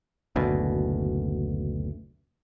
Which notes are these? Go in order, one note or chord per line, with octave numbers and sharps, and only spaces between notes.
F#1 D2 B2